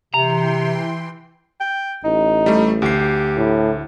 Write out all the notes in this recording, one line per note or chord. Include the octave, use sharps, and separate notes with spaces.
C3 E3 G5 A#5 C6
G5
A1 D#4
G3 A3
D2 G4 C7
A2